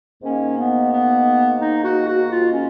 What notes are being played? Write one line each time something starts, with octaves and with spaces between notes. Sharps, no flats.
G#2 D#3 A#3 C#4
B3
B3
D#4
F#4
F#4
F4
C#4